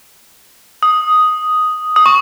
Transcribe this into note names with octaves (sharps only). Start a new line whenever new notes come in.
D#6
D#6
C#6